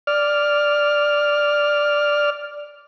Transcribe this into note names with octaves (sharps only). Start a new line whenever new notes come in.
D5 F6